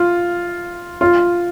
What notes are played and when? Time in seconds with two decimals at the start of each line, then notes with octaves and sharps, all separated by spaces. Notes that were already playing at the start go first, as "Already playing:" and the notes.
Already playing: F4
1.01 F4